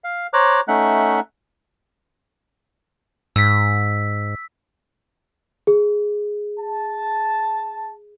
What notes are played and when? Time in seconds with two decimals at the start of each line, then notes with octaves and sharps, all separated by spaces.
0.04 F5
0.33 C5 C#5 A#5 D6 F#6
0.68 A3 C#4 D#4 E5 F#5 F#6
3.36 G#2 E6 B6
5.67 G#4
6.60 A5